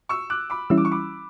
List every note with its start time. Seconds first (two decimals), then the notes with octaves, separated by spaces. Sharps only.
0.09 C#6 E6
0.30 D6 F#6
0.50 B5 D6
0.70 E3 G3 C#4 E4 E6
0.77 D6
0.85 C#6
0.91 B5 D6